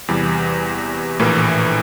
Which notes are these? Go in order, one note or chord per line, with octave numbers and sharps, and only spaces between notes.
E2 C3 E3 G3
A#1 A2 E3 A#3